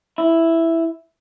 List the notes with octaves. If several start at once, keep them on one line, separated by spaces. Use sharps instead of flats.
E4